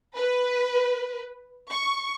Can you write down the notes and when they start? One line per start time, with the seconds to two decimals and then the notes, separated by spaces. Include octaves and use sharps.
0.14 B4
1.71 C#6